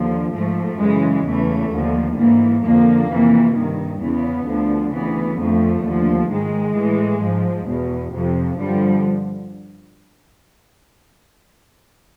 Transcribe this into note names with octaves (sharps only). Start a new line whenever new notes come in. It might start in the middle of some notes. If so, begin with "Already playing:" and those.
Already playing: D#2 D3 F3
G#2 F3 A3
F#2 C#3 E3 G#3
E2 C#3 E3 A3
D#2 D3 F3
G#2 E3 A#3
F2 D3 F3 A#3
F2 C3 E3
G2 D#3
E2 C#3 E3 B3
D2 D3 F3
D2 C#3 E3 B3
F2 D3 F3 A3
D#2 D3 F3
G#2 D#3 G#3
A2 E3
G#2 F3
E2 B2
F2 C3 F3
G2 D3 F3 G3